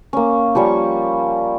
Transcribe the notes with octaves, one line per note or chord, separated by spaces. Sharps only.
A#3 C#4
F3 G3 C#4 C#6